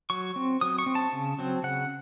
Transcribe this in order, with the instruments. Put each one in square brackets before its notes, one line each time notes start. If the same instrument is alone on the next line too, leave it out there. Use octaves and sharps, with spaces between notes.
[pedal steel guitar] F#3 C#6
C4
F#3 D#6
C#6
C4
A5
C#3
F#3 C4
C#3 F#5